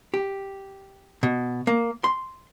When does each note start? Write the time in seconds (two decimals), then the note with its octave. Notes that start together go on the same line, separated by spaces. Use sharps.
0.14 G4
1.23 B2
1.67 A#3
2.04 C6